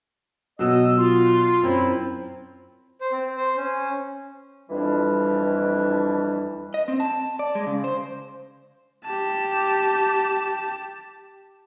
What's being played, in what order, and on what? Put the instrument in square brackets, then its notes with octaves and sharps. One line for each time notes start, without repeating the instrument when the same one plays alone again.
[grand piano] B2 F#3 [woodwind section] D#5 E6
[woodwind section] F4
[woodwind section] F#2 F#3 E4 [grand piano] C4
[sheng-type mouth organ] C5
C4
C5
C#4
[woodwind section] F2 E3 G3 D4
[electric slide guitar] D#5
C4
A5
D5
G#3
C#3
C5
[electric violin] G4 A5